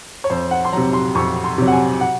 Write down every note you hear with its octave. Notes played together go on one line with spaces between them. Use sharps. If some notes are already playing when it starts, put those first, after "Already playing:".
C#5
F2 C5
F#5
C6
C3 F#3 A#5
C6
F2 C#6
C6
C3 F#3
F#5
G#5
F#5